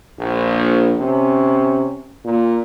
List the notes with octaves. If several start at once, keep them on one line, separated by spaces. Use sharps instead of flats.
A#1
C3 C#4
A#2